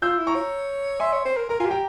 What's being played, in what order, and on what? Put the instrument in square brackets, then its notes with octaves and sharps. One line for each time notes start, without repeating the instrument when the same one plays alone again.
[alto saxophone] F4 [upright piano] E6 G6
[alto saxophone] E4
[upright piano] A#5 C#6
[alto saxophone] C#5
[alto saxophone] E5 [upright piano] G#5 C6
[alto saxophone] C#5
C5
A#4
[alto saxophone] A#4 [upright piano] A#5
[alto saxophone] F4 [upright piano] G#5
[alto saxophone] G4
[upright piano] G5 A#5